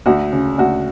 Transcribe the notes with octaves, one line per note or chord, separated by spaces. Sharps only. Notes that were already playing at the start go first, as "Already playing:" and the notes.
D2 F#4
C#3
D2 F#4